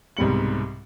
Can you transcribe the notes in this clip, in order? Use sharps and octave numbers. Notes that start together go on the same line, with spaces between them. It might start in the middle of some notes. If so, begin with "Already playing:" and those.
C2 G#2 B2 G3 C#7 F#7